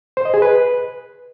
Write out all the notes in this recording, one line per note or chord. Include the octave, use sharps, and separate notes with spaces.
C5
D#5
G#4
B4